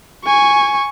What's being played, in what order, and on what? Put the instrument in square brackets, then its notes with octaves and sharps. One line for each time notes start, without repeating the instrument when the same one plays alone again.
[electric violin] G#5 C#6